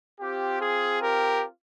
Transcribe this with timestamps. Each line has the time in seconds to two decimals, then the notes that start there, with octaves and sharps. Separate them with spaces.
0.20 C4 F4 G4
0.61 G#4
1.01 G4 A#4